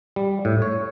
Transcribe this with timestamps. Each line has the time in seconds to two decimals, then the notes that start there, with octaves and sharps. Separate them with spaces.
0.16 G3
0.45 A2
0.62 C#5